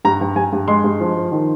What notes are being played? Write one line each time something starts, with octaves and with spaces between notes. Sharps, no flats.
G2 A#5
G2
G2 G#5
G2
G#3 C6
G2
F3
F3
D#3